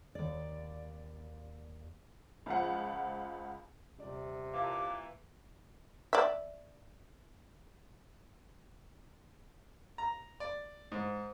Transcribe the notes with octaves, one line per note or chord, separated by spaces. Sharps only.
D#2 D5
C#2 F3 F#5
D#1 C3 D5
A#2 E3 F5 A5 D6
D5 E5
A#5
D5
G#2